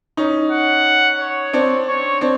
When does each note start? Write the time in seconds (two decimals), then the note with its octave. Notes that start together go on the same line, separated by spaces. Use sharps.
0.17 C#4 D#4
0.52 F#5
1.19 C#5
1.53 C4 D4
1.88 C#5
2.21 C4 D4